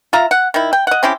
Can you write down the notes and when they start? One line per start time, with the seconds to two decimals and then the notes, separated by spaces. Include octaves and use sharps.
0.13 F4 E5 A#5
0.31 F#5
0.54 D#3 E4
0.73 G5
0.87 D#5 F#5
1.03 C4 C#4 E4 G4